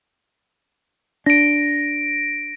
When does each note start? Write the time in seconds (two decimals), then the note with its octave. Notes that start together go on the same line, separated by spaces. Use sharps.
1.26 D4 A#6 D7